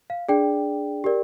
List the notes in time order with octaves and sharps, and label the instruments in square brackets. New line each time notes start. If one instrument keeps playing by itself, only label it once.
[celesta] F5
D4 G#4 D5 G5
G4 A#4 D5